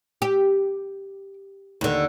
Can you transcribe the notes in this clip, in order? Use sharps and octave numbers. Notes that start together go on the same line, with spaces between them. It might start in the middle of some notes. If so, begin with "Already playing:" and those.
G4
D#2 D3